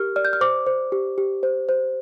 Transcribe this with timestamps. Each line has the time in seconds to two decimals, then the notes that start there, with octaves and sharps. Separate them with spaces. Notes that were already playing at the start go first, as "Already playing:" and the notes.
Already playing: G4 A#4 F6
0.16 D5 F6
0.25 G6
0.33 F6
0.41 C5 D6
0.67 C5
0.92 G4
1.18 G4
1.43 C5
1.69 C5